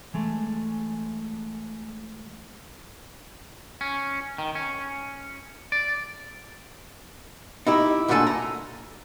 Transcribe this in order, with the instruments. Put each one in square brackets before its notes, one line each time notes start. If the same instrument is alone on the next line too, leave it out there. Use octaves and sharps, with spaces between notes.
[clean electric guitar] E3 G#3 A3
C#4
D#3
C#4
D5
[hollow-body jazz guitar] D#4 E4 G4
D2 A#2 D3 A3 A4 G#5
A#5